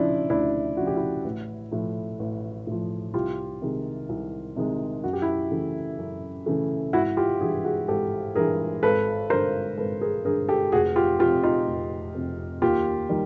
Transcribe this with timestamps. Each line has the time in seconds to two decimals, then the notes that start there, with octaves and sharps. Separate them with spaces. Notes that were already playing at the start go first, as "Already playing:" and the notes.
Already playing: D2 C#3 F3 D4 E4
0.30 D2 D4 E4
0.77 C#3 F3 F#4
0.87 G4
0.96 E4 F#4
1.24 A1
1.71 A2 F3
2.19 A1
2.67 A2 F3
3.14 C2 F4 G4
3.62 C3 D#3 G#3
4.09 C2
4.56 C3 D#3 G#3
5.04 F#2 F#4
5.13 G4
5.22 E4 F#4
5.51 C#3 E3 A3
5.98 F#2
6.46 C#3 E3 A3
6.93 G#1 E4 F#4
7.17 F4 G4
7.41 G2 E3 F#4 G#4
7.64 F#4 G#4
7.88 G#1 G4 A4
8.35 G2 E3 G#4 A#4
8.83 G#1 A4 B4
9.30 G2 D3 A#4 C5
9.78 G#1 A4 B4
10.01 G#4 A#4
10.25 G2 D3 G#4 A#4
10.48 G4 A4
10.72 F1 F#4 G#4
10.96 F4 G4
11.20 F2 C3 F4 G4
11.43 D#4 F4
11.67 F1
12.15 F2 C3
12.62 D#2 F4 G4
13.09 D#3 G3